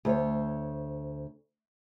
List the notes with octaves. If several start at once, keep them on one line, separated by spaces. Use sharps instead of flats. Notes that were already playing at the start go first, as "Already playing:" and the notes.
D2 C5 C#5